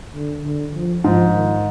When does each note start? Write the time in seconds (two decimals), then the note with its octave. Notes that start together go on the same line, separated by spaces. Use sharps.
0.14 D3
0.44 D3
0.75 F3
1.04 G#2 F3
1.35 D#3